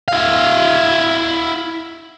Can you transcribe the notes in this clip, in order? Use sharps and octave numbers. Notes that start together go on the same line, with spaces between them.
E4 F5